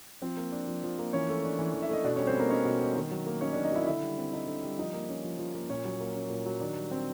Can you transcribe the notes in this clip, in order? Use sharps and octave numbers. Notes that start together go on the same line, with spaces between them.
F3 C4 C5
A#3
D4
F3
F3
A#3
E3 C#4 C#5
A3
D4
E3
E3
E5
A3 D#5
B2 D4 D5
C#4 C#5
G3
C4 C5
A#3 B3 A#4
C#4 D#4 C#5
B2
G3
D#3
F#3
A#3
C#4 D#4 C#5
D4 D5
D#3
D#4 D#5
F#3 E4 E5
D3 E4 E5
G3
C4
D#4
D3
G3
F3 D#4 D#5
A#3
C#4
F3
F3
A#3
A#2 C#4 C#5
F#3
A#3
C#4
A#2
F#3
D#3 D4 D5
G3
C4